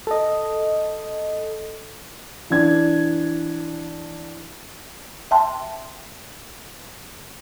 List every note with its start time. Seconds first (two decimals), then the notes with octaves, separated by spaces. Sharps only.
0.07 A4 D#5
2.50 E3 D4 G#6
5.31 E5 G5 A5 C6